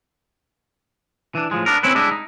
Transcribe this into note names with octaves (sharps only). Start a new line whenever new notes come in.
E3 D4
A2 F3 G#3
B3 D4 A#4
C4 C#4 E4 B4
G3 G#3 D4 E4 D#5
D#4